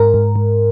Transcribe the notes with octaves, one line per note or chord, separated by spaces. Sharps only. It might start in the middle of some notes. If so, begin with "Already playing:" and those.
Already playing: G#2 A#4
G#2
G#2